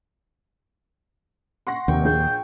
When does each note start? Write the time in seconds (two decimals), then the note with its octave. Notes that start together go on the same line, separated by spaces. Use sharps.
1.67 F#5 C6 C#6 A#6
1.88 F1 D#2 C3 G5 C#6
2.05 A#1 G#4 G6